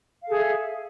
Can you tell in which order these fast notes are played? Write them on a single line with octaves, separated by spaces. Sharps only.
F5 A4 G#4 E5